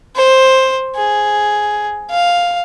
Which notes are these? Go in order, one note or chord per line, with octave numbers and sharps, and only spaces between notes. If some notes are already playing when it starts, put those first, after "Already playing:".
C5
G#4
F5